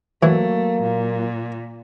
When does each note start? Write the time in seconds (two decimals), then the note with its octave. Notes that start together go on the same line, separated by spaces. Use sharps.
0.23 E3 F#3 A3 A#3
0.82 A#2